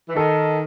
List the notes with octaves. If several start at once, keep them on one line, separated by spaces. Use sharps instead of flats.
E3
D#3 A4